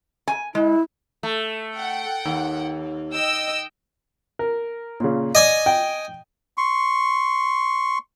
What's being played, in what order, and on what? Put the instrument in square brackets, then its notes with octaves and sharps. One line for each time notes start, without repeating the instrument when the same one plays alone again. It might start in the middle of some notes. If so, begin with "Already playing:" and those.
[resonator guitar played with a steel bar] G#5
[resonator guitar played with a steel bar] G#3 [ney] E4
[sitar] A3
[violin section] F#5 G5
[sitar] D#2
[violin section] D#5 G5 E6
[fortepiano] A#4
A#2 C#3
[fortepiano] D5 [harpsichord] D#5 G#5 D#6
[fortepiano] G5
[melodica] C6 C#6